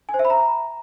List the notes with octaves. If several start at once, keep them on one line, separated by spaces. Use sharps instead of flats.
G#5
C5
E5
B5
A#5